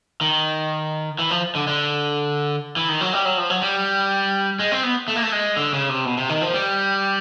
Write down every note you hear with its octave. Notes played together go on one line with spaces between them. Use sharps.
D#3
E3
F3
D3
D3
E3
D#3
F#3
G3
F#3
F3
F#3
G3
G#3
C4
B3
A3
A#3
A3
G#3
D3
C#3
C3
B2
C3
D#3
F3
G3